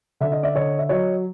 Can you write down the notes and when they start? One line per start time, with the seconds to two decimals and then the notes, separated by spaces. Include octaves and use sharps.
0.20 D3 E5
0.32 D#5
0.43 D5 E5
0.55 D3 C#5 D#5
0.79 E5
0.89 F#3 C#5 D#5